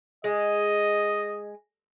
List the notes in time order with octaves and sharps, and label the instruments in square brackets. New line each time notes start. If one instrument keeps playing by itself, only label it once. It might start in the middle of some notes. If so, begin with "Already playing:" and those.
[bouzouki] G#3 [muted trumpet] D#5